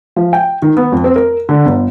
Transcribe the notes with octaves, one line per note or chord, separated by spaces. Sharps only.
F3
G5
D#3
B3
F2
C4
A#4
D3
G1